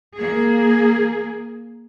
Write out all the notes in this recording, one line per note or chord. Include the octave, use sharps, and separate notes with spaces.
A#3 G#4